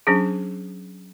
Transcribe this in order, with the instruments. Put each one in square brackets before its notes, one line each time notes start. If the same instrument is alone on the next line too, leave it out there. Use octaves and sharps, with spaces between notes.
[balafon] F#3 C#4 D4 G#4